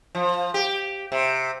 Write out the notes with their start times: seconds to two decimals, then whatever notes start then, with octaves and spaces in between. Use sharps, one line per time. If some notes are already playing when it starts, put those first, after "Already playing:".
0.15 F3
0.54 G4
1.12 C3